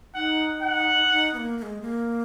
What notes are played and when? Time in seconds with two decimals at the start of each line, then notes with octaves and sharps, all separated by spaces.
0.15 D#4 F#5
0.62 F#5
1.10 D#4
1.34 B3
1.37 A#3
1.58 A#3
1.62 G#3
1.81 A#3